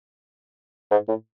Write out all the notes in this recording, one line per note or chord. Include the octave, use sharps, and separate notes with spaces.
G#2
A2